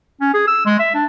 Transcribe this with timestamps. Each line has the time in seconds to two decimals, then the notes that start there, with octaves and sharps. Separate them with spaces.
0.21 C#4
0.34 G#4
0.47 E6
0.66 G#3
0.79 E5
0.94 D4